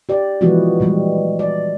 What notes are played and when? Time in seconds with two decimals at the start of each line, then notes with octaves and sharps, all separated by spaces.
0.09 G4 D5
0.41 E3 F3 G#3 B3 E4 F#4
0.80 A#2 E3 G3 G#3
1.39 D5